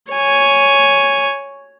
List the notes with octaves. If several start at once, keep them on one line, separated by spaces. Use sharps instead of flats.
C#5 G#5